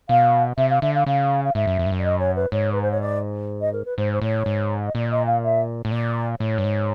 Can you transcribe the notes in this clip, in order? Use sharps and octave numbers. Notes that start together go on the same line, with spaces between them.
B2 F5
C3 E5
F5
D3 E5
F5
C#3 F5
F5
G#2 E5
F#2
F2
G2
F#2
D5
D#5
C#5
B4
G#2 C#5
B4
C5
C#5
D5
D#5
A#4
B4
G#2 C5
C5
A2 C#5
G#2
D#5
A#2 D5
D#5
F5
E5
A2
A#2 D5
A2 C#5
G2
G#2